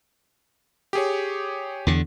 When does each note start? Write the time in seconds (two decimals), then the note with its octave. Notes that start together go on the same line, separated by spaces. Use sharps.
0.93 G4 G#4 C#5
1.87 E2 D3